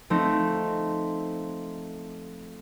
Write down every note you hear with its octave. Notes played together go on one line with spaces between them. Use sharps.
F3 A3 C4 D#4